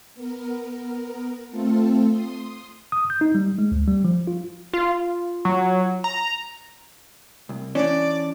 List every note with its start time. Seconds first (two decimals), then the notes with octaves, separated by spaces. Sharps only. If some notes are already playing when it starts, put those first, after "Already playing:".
0.15 B3 A#4
1.51 A3 C4 F4 A4
2.10 C6 D#6
2.92 D#6
3.10 G6
3.21 D#4
3.35 G3
3.59 G#3
3.72 D2
3.88 G3
4.05 F3
4.27 F4
4.74 F4
5.45 F#3
6.04 A#5
7.49 C2
7.75 E3 C#4 D4 D5